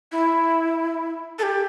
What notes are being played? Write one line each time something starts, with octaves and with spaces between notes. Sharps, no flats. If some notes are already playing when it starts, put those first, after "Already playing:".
E4
A4
G4